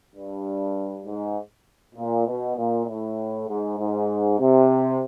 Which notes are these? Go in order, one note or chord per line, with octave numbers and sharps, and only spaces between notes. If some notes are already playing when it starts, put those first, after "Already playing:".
G2
G#2
A#2
B2
A#2
A2
G#2
G#2
C3